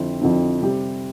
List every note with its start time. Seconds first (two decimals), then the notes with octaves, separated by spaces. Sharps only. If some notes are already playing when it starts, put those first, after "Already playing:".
Already playing: F2 D3 F3 C4 E4
0.21 F2 D3 F3 C4 E4
0.61 C3 G3 C4 G4